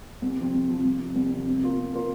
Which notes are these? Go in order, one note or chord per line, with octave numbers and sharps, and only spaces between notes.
C2
C3 F3 C4
C2
C3 F3 C4
C2
C3 F3
C2
C3 F3
C3
A#3 F4 A#4
C3
A#3 F4 A#4